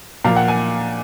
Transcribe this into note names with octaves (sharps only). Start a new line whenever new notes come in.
A#2 F3 A#3 F5
F#5
G#5